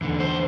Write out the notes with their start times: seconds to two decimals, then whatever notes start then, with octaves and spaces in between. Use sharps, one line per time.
0.01 E2 D3
0.20 C5